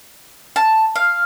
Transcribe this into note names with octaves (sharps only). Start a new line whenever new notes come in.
A5
F5